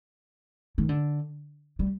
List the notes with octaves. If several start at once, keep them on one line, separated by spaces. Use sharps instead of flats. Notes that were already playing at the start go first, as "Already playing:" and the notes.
D#3
D3
G3